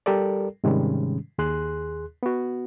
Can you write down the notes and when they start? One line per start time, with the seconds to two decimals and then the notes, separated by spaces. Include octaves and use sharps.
0.06 G3 G4 A4 A#4 D5
0.64 G#2 C3 D#3 G3 G#3 C#4
1.38 D#2 G#4 C6 F#6
2.23 B3 F#4